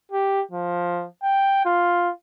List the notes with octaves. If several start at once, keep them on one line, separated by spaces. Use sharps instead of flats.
G4
F3
G5
F4